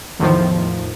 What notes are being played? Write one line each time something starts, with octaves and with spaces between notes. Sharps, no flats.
E2 A2 D#3 F3